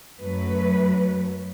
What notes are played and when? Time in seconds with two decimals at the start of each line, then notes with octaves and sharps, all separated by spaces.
0.19 F#2 F#3 A3 B4